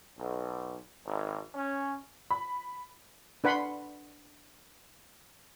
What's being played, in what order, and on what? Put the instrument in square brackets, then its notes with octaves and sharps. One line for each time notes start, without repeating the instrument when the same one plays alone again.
[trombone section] B1
G#1
C#4
[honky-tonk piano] B5
[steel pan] D4 B4 F#5 B5 C6